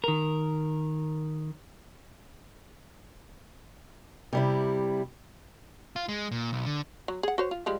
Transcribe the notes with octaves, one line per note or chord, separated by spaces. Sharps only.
D#3 A#4
C3 G3 E4
F4
G#3
A#2
B1
D3
F#3
G#4 F#5
F#4 C5 C#5
F4
F3 G3 G#3